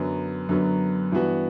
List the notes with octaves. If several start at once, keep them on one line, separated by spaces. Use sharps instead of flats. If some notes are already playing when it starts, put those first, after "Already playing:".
Already playing: F#2 D3 F#3 B3
F#2 D3 F#3 B3
G2 E3 B3 F#4